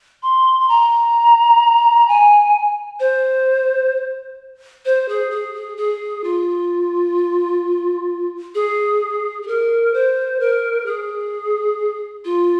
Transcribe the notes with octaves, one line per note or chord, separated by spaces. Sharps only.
C6
C6
A#5
G#5
C5
C5
G#4
G#4
G#4
G#4
F4
G#4
G#4
A#4
C5
A#4
G#4
F4